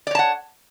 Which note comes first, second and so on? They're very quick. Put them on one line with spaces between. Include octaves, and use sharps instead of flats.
D5 C#5 A5 F#5